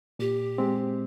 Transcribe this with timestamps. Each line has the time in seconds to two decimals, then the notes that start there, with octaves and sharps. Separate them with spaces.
0.19 A#2 G4
0.58 G#3 C4